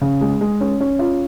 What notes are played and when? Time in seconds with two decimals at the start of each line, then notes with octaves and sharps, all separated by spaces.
0.01 C#3
0.21 G#3
0.41 G#3
0.61 C#4
0.81 C#4
0.99 F4